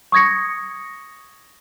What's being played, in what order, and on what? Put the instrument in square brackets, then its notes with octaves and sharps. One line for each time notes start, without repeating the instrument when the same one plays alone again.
[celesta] C#6 D#6 G#6 A#6 C#7